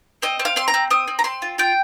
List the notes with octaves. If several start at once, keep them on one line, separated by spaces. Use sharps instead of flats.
C4 D#5
C4
F5
C4 C6
A#5
C4
C4 D#6
C4
A#5
C4 C6
F4
F4 G5